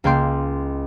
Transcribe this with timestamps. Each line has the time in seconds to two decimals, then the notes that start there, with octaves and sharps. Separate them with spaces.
0.04 C#2 A#3 G5 C6